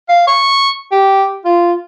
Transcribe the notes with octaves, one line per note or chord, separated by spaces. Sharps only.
F5
C#6
G4
F4